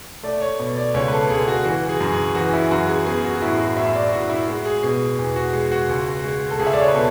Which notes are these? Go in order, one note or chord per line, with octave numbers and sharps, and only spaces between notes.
A3 D5
C#5
B2
D5
C#2 C#5
B4
A4
C#2 G#4
F#4
E3 F#4
G#4
F#2
G#4
E3 F#4
E4
F#2 F#4
G#4
B3 G#4
F#4
F#4
A2 E4
F#4
A2 E5
D5
A2 F#4
E4
G#3 F#4
G#4
B2 G#4
E2
F#4
G#3
F#4
C#2
G#3
A4
C#2 G#4
E5
D5
C#5
B4
B2 A4